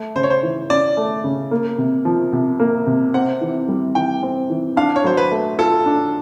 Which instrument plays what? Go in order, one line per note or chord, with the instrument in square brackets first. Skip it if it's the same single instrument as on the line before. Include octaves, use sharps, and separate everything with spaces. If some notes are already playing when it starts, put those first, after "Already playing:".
Already playing: [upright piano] A3
[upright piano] C#3 [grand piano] C5
[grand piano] C#5
C5
[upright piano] E3
[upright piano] C#4 [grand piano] D5
[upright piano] A3
C#3
A#3
C3
F3
C3
A#3
C3
[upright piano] C4 [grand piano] F#5
[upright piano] E3
G3
[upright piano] E3 [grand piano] G5
[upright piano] C4
E3
[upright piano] D4 [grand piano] F5
[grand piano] C#5
[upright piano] F#3 [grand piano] C5
[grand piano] B4
[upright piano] A3
[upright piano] F4 [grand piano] A4
[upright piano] D4